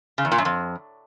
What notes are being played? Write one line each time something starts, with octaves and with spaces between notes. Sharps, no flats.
C#3
E2
A#2
F#2
F2